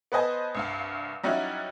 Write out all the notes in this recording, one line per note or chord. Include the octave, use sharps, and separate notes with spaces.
B3 B4 C5 D#5 G#5 A5
C2 G2 F5
F#3 G3 C#4 D#4 E4 F#4